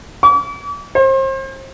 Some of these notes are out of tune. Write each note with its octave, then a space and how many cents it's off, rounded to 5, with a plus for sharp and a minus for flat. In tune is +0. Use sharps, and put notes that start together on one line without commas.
D6 -45
C5 +35